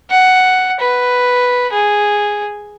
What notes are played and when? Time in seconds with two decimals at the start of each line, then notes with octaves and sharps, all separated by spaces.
0.10 F#5
0.80 B4
1.72 G#4